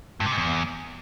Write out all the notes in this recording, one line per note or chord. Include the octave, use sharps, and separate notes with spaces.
G2
C3
G#2
E2